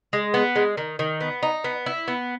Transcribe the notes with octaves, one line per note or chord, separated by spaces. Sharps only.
G#3
B3
G#3
D#3
D#3
B3
D#4
B3
E4
B3